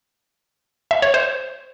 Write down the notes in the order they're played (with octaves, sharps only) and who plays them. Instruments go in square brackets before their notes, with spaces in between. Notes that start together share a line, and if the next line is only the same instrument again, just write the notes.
[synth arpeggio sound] E5
C#5
C5